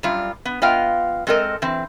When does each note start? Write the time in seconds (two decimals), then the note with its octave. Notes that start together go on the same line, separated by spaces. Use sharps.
0.03 F#2 G3 F4
0.45 B3
0.62 B3 F4 D#5 F5 G5
1.27 G#3 C4 A4 A#4 D#5
1.62 E3 C4